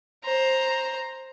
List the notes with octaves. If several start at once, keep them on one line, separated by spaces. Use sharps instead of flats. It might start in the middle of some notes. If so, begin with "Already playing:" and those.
C5 A#5